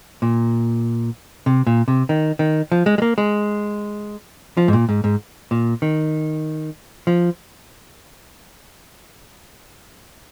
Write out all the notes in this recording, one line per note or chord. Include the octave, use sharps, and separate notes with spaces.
A#2
C3
A#2
C3
D#3
D#3
F3
G#3
G#3
A#3
G#3
F3
G#2
A#2
G#2
G#2
A#2
D#3
F3